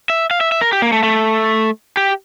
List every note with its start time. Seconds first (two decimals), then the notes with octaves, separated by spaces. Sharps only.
0.10 E5
0.31 F5
0.41 E5
0.52 E5
0.61 A#4
0.73 G4
0.82 A#3
0.92 A3
1.03 A3
1.97 G4